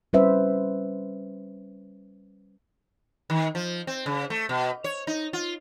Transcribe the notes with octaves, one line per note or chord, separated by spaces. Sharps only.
G3 C#4 B4 C5 E5
D#3
F3
C4
C#3
A3
B2
C#5
D#4
F4